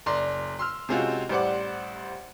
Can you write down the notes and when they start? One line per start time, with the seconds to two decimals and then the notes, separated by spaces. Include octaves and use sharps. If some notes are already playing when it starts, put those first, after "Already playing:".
0.06 F#1 D5 A#5 C6
0.59 C6 E6 F6
0.89 C3 G#3 C4 C#4 F4 F#4
1.29 A1 G3 C5 D5 F#5 D6